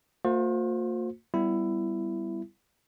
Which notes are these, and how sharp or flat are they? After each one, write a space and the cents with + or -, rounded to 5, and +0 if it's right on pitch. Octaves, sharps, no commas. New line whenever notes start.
A#3 -40 F4 +45 C5 +0
G3 +0 B3 +20 E4 +15